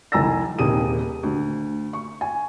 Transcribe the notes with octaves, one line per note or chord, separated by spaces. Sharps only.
F1 C2 G#5 A#5 E6 A#6
D#1 D#2 C3 G#4 D#6 D#7
D2
C#6
G#5